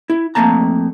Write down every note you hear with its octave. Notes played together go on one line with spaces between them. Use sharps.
E4
F2 G#2 A3 A#3 A5 A#5